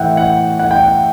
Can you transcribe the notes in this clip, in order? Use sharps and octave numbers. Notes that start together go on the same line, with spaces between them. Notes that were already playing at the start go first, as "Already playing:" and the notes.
Already playing: A2 E3 E5 F#5 G5
F#5
F#5
G5
F#5